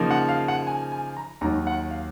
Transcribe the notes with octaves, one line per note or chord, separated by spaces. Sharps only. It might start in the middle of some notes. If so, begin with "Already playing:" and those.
Already playing: C#3 F3 A#3 D#4
F#5
F5
F#5
G#5
G#5
A#5
D#2 D#3 F#3 A#5
F#5
F5